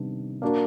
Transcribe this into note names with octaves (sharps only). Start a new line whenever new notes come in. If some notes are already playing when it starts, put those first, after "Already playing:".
Already playing: C3 D#3 G3 B3 D4
A#3 D4 F#4 A#4